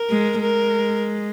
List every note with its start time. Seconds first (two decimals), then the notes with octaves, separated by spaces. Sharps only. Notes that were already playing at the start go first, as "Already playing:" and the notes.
Already playing: A#4
0.10 G#3
0.41 G#3 A#4